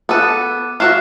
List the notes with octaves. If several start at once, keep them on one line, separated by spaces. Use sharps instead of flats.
B3 A4 D6 F#6 D#7
F4 F#4 E5 F#6 C7 E7